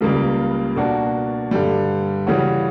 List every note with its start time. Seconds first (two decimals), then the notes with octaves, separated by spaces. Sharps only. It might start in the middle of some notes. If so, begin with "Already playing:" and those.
0.01 C#2 C#3 G3 A#3
0.76 B2 A#3 D4 F#4
1.51 G2 D3 G3
2.27 C#3 E3 G3 C#4 F#4